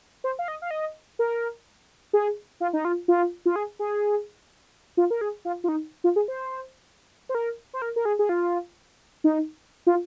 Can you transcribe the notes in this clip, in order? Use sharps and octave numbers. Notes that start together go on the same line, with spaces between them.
C5
F5
D#5
F5
D#5
A#4
G#4
F4
D#4
F4
F4
F4
G#4
G#4
F4
A#4
G#4
F4
F4
D#4
F4
G#4
C5
C5
A#4
C5
A#4
A#4
G#4
G#4
F4
D#4
F4